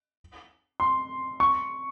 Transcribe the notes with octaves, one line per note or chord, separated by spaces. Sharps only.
C6
C#6